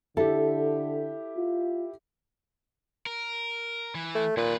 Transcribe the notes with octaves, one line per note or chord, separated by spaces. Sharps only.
D3 E4 G4 A4
F4
A#4
E3
A3
D#2 A#2 B4